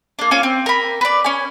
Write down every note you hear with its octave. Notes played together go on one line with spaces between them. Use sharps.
A#3 D4
A#3 C#4 F4 F5
C4
A#4 B5
B4 D5
C#4 G#5